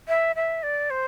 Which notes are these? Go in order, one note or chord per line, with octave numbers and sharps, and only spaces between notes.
E5
E5
D5
C5